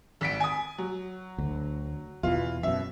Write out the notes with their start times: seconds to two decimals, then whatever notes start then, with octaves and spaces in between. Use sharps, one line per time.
0.21 G#1 B6 D7
0.40 G#5 D#6
0.78 F#3
1.38 D2
2.23 E2 B2 E3 F4
2.63 F#2 B2 E5